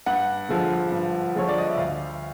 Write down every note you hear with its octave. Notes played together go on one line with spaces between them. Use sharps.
G2 F#5
D3 F3 G#3
G2
D3 F3 G#3 C#5
D5
D#5
E5
D2 F5